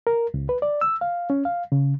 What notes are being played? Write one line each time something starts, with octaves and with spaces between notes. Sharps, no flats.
A#4
C#2
B4
D5
E6
F5
C#4
F5
C#3